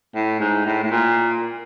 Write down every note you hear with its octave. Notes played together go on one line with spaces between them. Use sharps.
A2
G#2
A2
A2
A#2